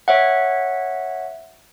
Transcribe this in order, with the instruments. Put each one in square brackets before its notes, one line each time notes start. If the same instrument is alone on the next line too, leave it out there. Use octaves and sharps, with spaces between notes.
[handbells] C#5 E5 F#5